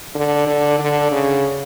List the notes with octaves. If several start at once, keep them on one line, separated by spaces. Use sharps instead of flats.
D3
D3
D3
C#3